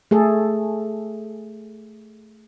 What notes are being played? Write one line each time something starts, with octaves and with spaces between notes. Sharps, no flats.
A3 G#4 A4